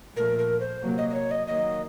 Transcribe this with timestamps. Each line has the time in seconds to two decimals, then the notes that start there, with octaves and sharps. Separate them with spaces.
0.16 A#2 F3 A3 A#4
0.38 A#4
0.60 C5
0.82 C3 F#3 A#3
0.98 D#5
1.10 D#5
1.14 C#5
1.31 D#5
1.47 D#3 F#3 A#3 D#5